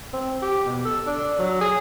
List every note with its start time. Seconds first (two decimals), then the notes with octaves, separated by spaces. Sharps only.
0.13 C4
0.42 G4
0.66 B2
0.85 A4
1.07 D4
1.39 F#3
1.61 G#4